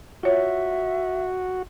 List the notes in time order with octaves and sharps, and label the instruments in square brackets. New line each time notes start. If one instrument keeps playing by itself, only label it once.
[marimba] F4 C#5 [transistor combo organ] F#4 [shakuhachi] E5